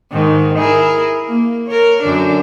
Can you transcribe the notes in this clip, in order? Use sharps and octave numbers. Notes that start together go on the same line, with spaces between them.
G#2 D#3
E4 G#4 A#4
A#3
A#4 C#5
F#2 D3 D4